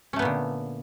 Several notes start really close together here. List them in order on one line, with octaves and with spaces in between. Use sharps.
C#4 A3 B3 A#2 D3